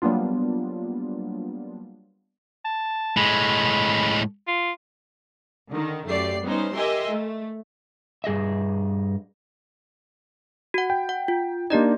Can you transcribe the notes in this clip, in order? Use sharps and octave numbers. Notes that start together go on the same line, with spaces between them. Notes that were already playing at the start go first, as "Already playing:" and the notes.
F#3 G3 A#3 B3 D4 F4
A5
A2 G#3 B5
F4
D3 D#3
F#2 A3 G4 D5 C7
G3 B3 C#4 D#4 C5
G4 A#4 D#5 E5 G#5 C6
A3
G2 G#4 D#5 E5
F#4 F#5
G5
F#5
F4
A#3 D4 D#4 G4 D5 D#5